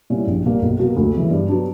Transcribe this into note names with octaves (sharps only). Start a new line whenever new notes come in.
A#2 G3 C#4 E4
A#1
A#2 G3 A#3
B1
B2 F#3 A#3
D2
C#3 E3
G2
F#3 B3 D4